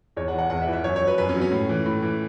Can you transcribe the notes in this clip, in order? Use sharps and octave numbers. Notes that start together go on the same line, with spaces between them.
E2 C#5
F#5
E3
F#5
E2 F#5
E5
E3
E5
F#2 C#5
C#5
F#3
B4
F#2 B4
C#4
F#3
C#4
A2
E3
A2
E3